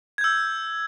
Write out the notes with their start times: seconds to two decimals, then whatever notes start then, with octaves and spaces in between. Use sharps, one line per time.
0.18 G#6
0.21 G6
0.24 E6